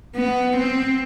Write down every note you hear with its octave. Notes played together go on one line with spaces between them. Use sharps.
B3
C4